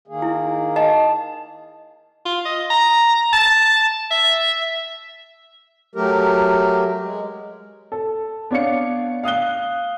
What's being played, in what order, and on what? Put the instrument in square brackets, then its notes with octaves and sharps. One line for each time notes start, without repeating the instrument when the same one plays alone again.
[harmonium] D#3 A#3 G#4
[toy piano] E4
[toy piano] D#5 [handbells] A5
[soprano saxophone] F4
D#5
A#5
A5
E5
[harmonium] F#3 A3 G4 A#4
G#3
[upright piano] A4
B3 D4 C#5 F5 C#7
F5 D#6 F#6 G7